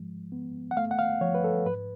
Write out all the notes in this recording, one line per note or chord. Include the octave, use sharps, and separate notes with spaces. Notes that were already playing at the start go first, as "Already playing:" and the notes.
Already playing: G#2 F3 G#3
B3
F#5
A3 F5
F#5
F5
F3 C#5
B4
A4
G#2 B4